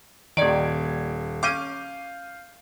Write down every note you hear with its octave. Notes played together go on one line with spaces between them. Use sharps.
D#1 D#3 D5 G#6 D7
C#4 F5 D6 G6 D#7